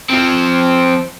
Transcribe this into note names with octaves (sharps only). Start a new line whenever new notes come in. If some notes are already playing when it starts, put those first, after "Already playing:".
F3 C4